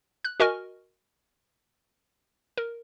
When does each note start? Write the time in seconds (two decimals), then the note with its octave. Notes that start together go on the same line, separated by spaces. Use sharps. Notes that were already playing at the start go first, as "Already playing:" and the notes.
0.25 F#6
0.40 F#4 A#4 D#5 G#5 C#6 F6
2.58 A#4